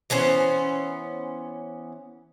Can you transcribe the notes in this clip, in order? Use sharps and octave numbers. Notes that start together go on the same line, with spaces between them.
E3 B3 C#4 C5